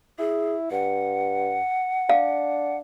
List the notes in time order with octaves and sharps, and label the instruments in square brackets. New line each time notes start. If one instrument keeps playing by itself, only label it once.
[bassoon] E4 [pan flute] G#4
[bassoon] G2 [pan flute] F#5
[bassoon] D4 [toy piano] F5